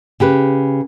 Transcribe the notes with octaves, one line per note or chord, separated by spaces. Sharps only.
C#3 G4 B4